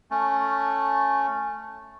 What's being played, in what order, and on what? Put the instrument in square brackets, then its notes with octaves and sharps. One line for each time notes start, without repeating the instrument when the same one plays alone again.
[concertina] A3 C#4